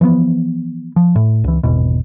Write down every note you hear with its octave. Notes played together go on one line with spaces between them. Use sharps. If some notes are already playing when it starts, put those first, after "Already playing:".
E3 F3 A3 B3
F3
A2
C#2 E3
G#1 E2 B2